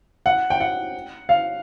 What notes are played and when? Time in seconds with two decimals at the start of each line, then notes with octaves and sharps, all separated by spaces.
0.26 F#5
0.50 G5
0.60 F#5
1.29 F5